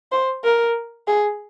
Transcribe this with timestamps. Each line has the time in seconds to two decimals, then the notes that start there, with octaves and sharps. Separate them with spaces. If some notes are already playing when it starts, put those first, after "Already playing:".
0.12 C5
0.44 A#4
1.07 G#4